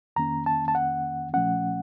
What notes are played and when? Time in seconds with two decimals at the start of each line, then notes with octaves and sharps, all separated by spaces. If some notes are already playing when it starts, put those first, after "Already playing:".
0.16 F2 D#3 A#3 C#4 A#5
0.46 A5
0.68 A5
0.75 F#5
1.34 A#2 F3 A3 C#4 F#5